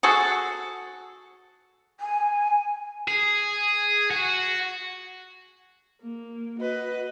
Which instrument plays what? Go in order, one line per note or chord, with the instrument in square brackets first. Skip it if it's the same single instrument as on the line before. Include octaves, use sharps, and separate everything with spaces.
[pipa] F#4 G#4 A4
[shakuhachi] G#5
[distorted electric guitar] G#4
F#4
[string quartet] A#3
F#4 B4 D#5